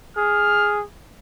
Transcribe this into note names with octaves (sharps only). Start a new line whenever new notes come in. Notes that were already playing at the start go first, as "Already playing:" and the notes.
G#4 F6